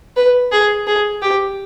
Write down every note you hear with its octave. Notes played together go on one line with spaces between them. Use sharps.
B4
G#4
G#4
G4